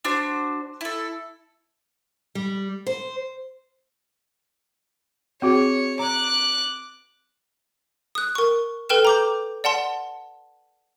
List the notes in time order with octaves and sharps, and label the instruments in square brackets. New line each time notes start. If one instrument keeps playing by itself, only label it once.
[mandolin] D4 F#4 C5
E4 A4
[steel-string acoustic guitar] G3
C5
[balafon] C4 F#4 G#4 [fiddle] C#5
[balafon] A#5 [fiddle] D6 F#6
[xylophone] D#6 F#6
A#4 C#6
A4 B4 G5 F6 E7
A#5 D6 G6
D5 F#5 A5 C6